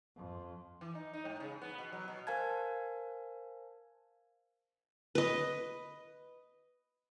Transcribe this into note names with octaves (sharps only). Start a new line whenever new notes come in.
F2
E3
D#4
D#4
G#2
C#3
B3
B2
F#3
B2
A#4 C5 F5 G#5 A5 G#6
B4 D#5